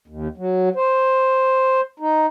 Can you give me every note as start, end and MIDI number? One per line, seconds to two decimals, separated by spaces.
0.08 0.28 39
0.37 0.69 54
0.76 1.81 72
2.00 2.26 63